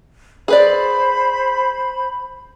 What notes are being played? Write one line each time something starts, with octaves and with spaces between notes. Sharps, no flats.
G#4 B4 C5 D5 B5